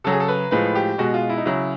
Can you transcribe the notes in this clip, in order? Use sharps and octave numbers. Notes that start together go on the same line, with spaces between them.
C#3 F#3 A4
G#4
A4
B4
A2 F3 G#3 B4
G4
B2 G#3 F#4
F4
E4
D#4
C#3 F#3 E4